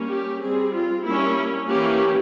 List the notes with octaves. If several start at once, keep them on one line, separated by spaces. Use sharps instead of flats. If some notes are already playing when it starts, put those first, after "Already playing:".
Already playing: G3 A#3 C#4
G4
G3 C4 G#4
F4
G3 A#3 C#4 E4
E3 A#3 C#4 G4